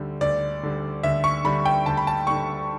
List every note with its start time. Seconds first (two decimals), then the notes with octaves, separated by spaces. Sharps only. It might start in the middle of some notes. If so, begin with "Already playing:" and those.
Already playing: D2 D3 G3
0.21 D2 D5
0.63 D3 G3
1.03 D2 E5
1.24 C#6
1.44 D3 G3 B5
1.65 G5
1.86 D2 A5
1.97 B5
2.07 A5
2.27 D3 G3 C#6